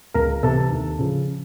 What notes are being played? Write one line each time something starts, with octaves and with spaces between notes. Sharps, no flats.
C#2 A#4 A#5
C3 E3 A4 A5
D#2
C#3 F3